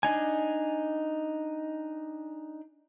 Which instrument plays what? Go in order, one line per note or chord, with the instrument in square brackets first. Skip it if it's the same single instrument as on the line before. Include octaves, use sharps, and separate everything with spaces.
[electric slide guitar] D4 D#4 G#5